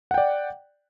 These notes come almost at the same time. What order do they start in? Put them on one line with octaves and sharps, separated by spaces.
F#5 G5 D5